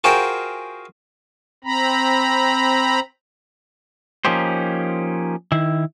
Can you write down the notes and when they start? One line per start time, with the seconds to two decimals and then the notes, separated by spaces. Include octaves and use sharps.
0.04 F4 F#4 G#4 A#4 C5 G5
1.64 C4 A#5 B5
4.25 F3 A#3 C#4 D#4 G4 C5
5.52 D#3 E4